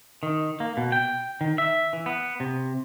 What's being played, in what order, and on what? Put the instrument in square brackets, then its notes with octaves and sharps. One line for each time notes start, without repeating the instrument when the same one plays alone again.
[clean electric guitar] D#3
A#3
B2
G5
D#3
E5
E3
B3
C3